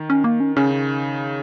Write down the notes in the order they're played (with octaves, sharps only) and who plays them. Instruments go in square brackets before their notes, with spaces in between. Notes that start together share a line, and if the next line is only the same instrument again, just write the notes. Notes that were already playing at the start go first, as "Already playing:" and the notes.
Already playing: [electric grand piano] D#3
[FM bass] C#4
A#3
C#4
[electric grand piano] C#3 [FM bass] C#4